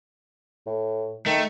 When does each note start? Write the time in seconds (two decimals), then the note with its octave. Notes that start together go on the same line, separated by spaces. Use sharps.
0.66 A2
1.26 D#3 A3